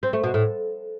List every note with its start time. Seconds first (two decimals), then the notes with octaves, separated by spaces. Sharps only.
0.03 C4
0.13 A3
0.24 B2
0.34 A2